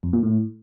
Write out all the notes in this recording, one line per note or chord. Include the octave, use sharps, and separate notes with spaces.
F2
A#2
A2